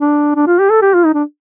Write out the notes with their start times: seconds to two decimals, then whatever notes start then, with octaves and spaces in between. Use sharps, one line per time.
0.01 D4
0.36 D4
0.47 F4
0.59 G4
0.70 A4
0.82 G4
0.94 F4
1.05 D#4
1.14 D4